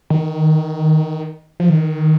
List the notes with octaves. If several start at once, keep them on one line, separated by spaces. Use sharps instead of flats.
D#3
F3
D#3